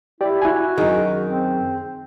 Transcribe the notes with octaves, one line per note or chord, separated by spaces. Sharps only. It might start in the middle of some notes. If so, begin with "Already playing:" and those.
E4 G4 D5
E4 F#4 G#5
F#2 D#3 G#4
C4